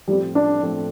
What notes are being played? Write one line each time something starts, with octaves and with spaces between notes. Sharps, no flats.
A2 F3 G3 A3 C4
D4
A2 F3 A3 C4